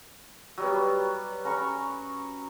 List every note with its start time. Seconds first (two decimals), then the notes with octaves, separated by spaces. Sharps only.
0.58 F#3 G3 B3
1.45 C#4 A#5 B5 C#6